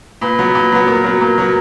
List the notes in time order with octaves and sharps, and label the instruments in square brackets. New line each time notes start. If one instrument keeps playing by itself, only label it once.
[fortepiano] A#2 [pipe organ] B4
[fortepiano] F#3 B3
A#2
F#3 B3
[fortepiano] A#2 [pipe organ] A#4
[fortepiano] F#3 B3
[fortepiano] A#2 [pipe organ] A#4
[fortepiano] F#3 B3